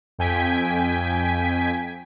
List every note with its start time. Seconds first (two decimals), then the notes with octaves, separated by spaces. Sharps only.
0.19 F2 G5 G#5 B6